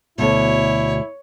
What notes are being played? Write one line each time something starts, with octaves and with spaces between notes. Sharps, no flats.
D2 B2 E4 C#5